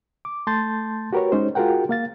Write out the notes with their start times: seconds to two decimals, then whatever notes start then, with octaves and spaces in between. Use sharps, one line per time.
0.25 D6
0.47 A3 A5 C6 G6 A6
1.13 F#4 G4 A#4 B4 C#5
1.32 G#3 C#4 D#4 C5
1.55 F4 F#4 G#4 A#4 F#5 G5
1.89 A#3 F5 A6